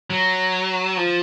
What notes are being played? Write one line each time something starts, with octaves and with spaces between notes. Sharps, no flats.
F#3
F3